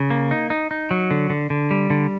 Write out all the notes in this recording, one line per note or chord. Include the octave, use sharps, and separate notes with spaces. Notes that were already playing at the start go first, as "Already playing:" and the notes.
Already playing: C#3
A#3
D#4
D#4
D#4
F#3
D3
D3
D3
G3
D3